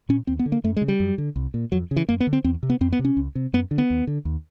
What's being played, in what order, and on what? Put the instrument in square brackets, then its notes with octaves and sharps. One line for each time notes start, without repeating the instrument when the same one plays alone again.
[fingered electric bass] A#2 C#4
D#2 C4
B3
D3
A#3
F#2 A3
G#3
C#3
G3
F#2
D3
C2
A#2
F2 F#3
C#3
E3
F#2 A#3
B3
D3
C4
E2 C4
C3
B3
F2 C4
B3
C3
C#4
C#2
C3
F#2 B3
D3
B3
D#2
D3
D#2